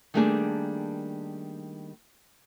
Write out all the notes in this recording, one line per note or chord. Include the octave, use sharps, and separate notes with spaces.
D#3 G3 A3 A#3 D4 G#4